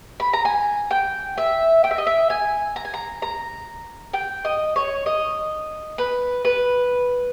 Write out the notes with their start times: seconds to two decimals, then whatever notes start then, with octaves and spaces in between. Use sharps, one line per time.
0.20 B5
0.33 A#5
0.45 G#5
0.91 G5
1.38 E5
1.84 G5
1.91 E5
1.98 D#5
2.07 E5
2.30 G#5
2.76 A#5
2.85 G#5
2.94 A#5
3.22 A#5
4.14 G5
4.45 D#5
4.76 C#5
5.06 D#5
5.98 B4
6.45 B4